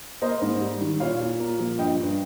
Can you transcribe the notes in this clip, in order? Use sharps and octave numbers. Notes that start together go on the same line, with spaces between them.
A#3 C5 D#5
G#2
G3
D#3
A#2 C#5 F5
A#2
A#3
F3
G2 D#5 G5
G2